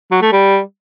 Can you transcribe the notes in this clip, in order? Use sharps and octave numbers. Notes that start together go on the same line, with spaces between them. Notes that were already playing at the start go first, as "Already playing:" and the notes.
F#3
A3
G3